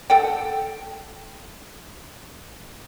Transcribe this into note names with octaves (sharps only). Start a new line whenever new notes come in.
A4 F#5 G5